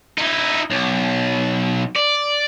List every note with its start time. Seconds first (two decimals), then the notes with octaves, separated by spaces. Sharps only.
0.18 D#4 E4
0.70 B1
1.96 D5